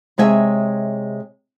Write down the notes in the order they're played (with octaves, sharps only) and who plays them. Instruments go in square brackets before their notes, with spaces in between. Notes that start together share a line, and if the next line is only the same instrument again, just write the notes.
[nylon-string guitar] C3 G#3 C#5 E5 G#5